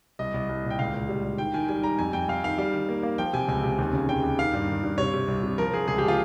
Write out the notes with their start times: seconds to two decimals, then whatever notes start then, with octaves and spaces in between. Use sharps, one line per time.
0.19 C2 D#5
0.34 C2
0.49 C2
0.64 A#2
0.70 G5
0.79 C#2 F5
0.94 C#2
1.09 G3
1.24 G3
1.38 D#3 G5
1.54 D#3 G#5
1.68 G3 G#5
1.83 G3 A#5
1.99 F2 G#5
2.13 F2 G5
2.28 F2 F5
2.44 D#3 F5
2.58 G3 F5
2.73 D#3
2.89 A#3
3.03 A#3
3.18 F3 G5
3.33 C3 G#5
3.48 C#2 G#5
3.63 C3
3.78 D#2
3.93 C#3
4.09 C#3 G5
4.23 D#2
4.39 D#3 F5
4.53 G2
4.68 D#3
4.83 G2
4.98 C3 C#5
5.14 C3
5.28 C2
5.43 C3
5.58 F3 A#4
5.74 F3 G#4
5.88 C#2 G#4
5.98 G4
6.04 F3 F4